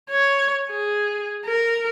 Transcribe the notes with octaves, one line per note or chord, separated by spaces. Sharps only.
C#5
G#4
A#4